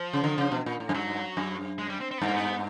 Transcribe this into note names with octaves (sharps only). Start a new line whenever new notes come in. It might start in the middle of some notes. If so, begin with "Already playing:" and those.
Already playing: F3
C#3
D3
C#3
B2
A#2
A2
F#2
G2 F#3
F#2
G#3
G3
C4
C4
B3
G2 A#3
B3